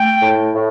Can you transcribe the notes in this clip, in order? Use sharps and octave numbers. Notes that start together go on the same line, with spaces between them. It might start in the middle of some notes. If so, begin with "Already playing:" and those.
Already playing: A3 G5
A2
A2